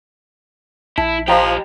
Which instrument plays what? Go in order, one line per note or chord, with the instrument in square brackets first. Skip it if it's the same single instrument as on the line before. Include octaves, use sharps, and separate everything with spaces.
[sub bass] A#1 [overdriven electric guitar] E4 [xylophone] A5
[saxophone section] F3 [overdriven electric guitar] G4 D#5 [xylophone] G5 A#5